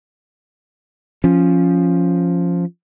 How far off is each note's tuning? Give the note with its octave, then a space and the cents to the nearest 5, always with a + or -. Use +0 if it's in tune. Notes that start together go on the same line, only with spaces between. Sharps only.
F3 +0 C#4 +0